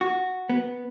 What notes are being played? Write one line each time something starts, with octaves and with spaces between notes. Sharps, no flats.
F#4
B3